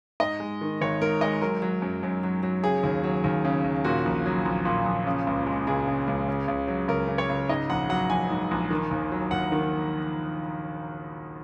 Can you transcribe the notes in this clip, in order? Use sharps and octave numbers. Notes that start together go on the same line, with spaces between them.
G#2 D#5
G#3
D#3
G#1 C#5
G#2 A#4
G#3 D#5
F#3 A#4
F#3
F#2
F#2
F#3
F#3
C#3 G#4
D#2
F#3
D#2
C#3
D#2
A#2 F#4
A#1
F#3
A#1
A#2
A#1
C#3
C#2
G#3
C#2 G#4
C#3
C#2
C#3
C#2
F#3
C#2 A#4
C#3
C#5
C#2
G#2 D#5
A#1 F#5
F#3 F#5
A#1 G#5
G#2
A#1
D#3
D#2
F#3
D#2 F#5
D#3